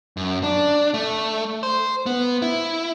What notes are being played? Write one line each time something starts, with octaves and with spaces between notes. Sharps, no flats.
F#2
D4
A3
C5
B3
E4